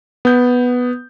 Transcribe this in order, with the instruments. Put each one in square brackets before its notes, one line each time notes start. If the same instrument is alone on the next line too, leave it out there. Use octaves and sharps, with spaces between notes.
[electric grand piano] B3 G6